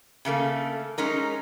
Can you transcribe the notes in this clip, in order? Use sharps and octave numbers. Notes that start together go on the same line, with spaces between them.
C#3 A3 A#3 A4
G#3 C#4 D#4 A#4